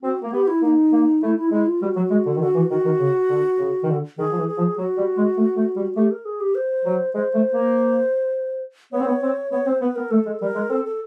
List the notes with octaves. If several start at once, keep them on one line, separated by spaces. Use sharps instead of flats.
C4 F#4
A#3
B3 G4
E4
A#3 D#4
A#3
A3 E4
E4
G#3 E4
F4
G3 F#4
F#3
G#3
D3
D#3
D3 F#4
E3
D#3 F#4
D#3
C#3
D3
C#3
D#3
D3
D#3 G#4
F3
E3
G#4
F3
F#3 F#4
G3
G#3
A3
A3
G3
A3 G4
A#4
G#4
G4
C5
F#3
G#3 C5
A3
A#3
B3 C#5
C4
B3
C4
B3 C#5
C4 C5
B3 B4
B3 A#4
A3 A4
G#3
G3 A#4
G#3
C4 A4
A4